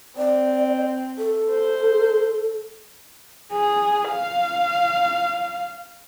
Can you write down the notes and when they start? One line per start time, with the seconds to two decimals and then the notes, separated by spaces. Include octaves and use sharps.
0.17 C4 D5
1.18 A4
1.51 C5
3.53 G#4
4.10 F5